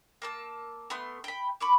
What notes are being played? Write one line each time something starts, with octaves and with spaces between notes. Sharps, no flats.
A#3 A5 E6
A3 B3 C6
G5 B5
B5 C#6 D6